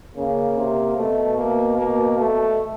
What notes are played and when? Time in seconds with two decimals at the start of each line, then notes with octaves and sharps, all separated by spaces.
0.17 C#3 A#3
0.57 C3
0.97 B2 A3
1.38 A#3
1.78 A#3
2.18 A3